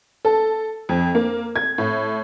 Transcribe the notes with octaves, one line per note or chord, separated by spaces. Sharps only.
A4
F2
A#3
G#6
A2